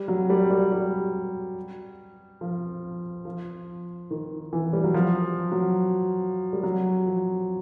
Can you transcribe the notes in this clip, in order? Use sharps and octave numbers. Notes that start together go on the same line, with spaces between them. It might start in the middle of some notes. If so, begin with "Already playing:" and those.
Already playing: G3
F#3
G3
G3
G3
F3
F3
D#3
E3
G3
F#3
F3
F#3
G3
F#3
F3